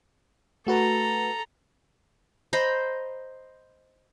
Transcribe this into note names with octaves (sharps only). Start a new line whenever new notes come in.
A3 F#4 A4 B4 A#5
C5 D#5 A#5 B5